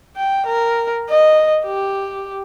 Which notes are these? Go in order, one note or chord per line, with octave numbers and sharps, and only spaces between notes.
G5
A#4
D#5
G4